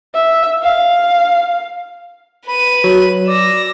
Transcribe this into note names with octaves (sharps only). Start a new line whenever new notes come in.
E5
F5
B4 B5 D#7
F#3
D5 E6 A#6